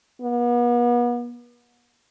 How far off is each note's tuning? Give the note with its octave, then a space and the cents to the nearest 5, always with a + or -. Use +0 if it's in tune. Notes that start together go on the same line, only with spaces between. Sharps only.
B3 -40